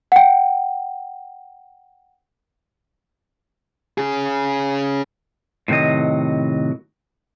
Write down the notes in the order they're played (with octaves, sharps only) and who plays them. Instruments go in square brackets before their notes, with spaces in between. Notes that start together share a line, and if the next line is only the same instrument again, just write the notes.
[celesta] F#5 G5
[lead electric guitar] C#4 G#4
[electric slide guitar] A2 C3 D#3 F#3 D#5